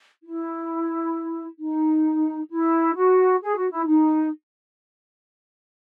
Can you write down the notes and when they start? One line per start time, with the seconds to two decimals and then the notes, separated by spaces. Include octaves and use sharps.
0.24 E4
1.59 D#4
2.50 E4
2.96 F#4
3.42 G#4
3.56 F#4
3.71 E4
3.86 D#4